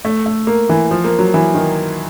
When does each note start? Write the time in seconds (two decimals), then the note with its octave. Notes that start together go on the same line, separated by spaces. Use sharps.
0.05 A3
0.26 A3
0.47 A#3
0.69 E3
0.91 F3
1.04 A#3
1.19 F#3
1.34 E3
1.55 D#3